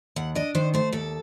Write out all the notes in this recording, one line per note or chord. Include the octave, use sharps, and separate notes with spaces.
D#2 F#5
D4 D#5
D#3 C5
A3 C5
D#2 A4